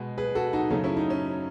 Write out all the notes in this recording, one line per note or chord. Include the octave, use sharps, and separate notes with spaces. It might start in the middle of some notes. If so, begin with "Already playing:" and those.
Already playing: B2 G#3
G#4 B4
F#4 A4
D#4 F#4
F#2 C#3 F#3 A3 D#4
C#4 E4
D#4
C#4